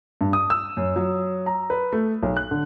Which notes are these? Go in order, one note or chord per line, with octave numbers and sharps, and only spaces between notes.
G2
D#6
E6
F#2
F#3
A#5
B4
A3
B1
F#6
D3